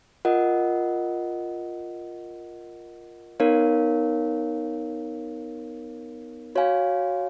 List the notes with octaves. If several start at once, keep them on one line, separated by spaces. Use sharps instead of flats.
F4 A#4 D#5 F#5
B3 D#4 A#4 C#5 F5
F#4 C#5 F5 G#5